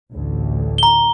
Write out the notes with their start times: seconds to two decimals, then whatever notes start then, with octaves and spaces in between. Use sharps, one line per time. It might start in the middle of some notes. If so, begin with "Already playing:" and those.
0.11 A1 D2
0.78 A#5 G7